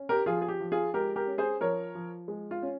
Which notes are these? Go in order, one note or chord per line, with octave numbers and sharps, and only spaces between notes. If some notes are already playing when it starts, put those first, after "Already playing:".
Already playing: C#4
G4 A#4
F3 F4 G#4
G#4
G4
F3
F4 G#4
G#3 G4 A#4
G4 A#4
C#4
G#4 C5
F3 A#4 C#5
F3
G#3
F4
C#4